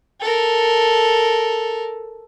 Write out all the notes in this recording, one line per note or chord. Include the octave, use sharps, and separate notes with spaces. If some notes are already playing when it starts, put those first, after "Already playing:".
A4 A#4